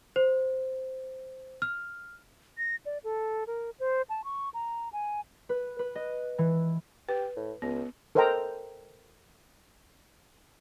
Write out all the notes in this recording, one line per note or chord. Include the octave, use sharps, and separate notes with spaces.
C5
F6
A#6
D5
A4
A#4
C5
A5
C#6
A#5
G#5
B4
B4
D#5
E3
G4 B4
A2
C#2 B3
A4 A#4 C5 D#5 G5 A#5